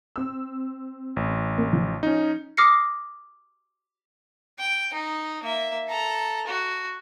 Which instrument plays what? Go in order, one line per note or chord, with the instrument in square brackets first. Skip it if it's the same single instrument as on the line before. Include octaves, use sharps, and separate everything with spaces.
[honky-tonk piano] C4 E6
[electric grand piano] A1
[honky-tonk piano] A#3
F3
[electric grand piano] C#4 D#4
[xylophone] D6 D#6 F6 A#6 C7 C#7
[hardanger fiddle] G5
D#4
A#3 E5
A4 A#5
F#4